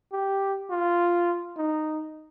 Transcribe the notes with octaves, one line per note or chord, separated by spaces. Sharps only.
G4
F4
D#4